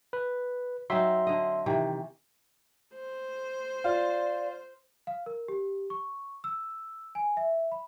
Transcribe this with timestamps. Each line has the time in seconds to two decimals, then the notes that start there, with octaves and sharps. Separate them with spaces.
0.13 B4
0.90 F#3 C4 D#4 E5 C6
1.27 D3 D#5
1.66 C3 D#3 E3
2.94 C5
3.84 F4 D5
5.07 F5
5.26 A#4
5.48 G4
5.90 C#6
6.44 E6
7.15 G#5
7.37 E5
7.72 B5